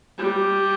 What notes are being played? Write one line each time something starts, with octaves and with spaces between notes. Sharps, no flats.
G3